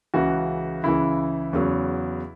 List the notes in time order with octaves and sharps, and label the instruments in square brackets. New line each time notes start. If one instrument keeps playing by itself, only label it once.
[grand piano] C#2 C#3 E3 F#4
C#2 C#3 E3 E4
E2 C#3 F#3